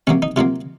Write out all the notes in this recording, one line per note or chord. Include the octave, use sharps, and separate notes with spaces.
C3 F#3 A#3 C#4
D#4
C3 F#3 A#3 F4